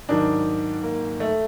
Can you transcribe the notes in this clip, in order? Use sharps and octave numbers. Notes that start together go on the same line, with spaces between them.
G#2 D#3 F#3 D4
A#3
A3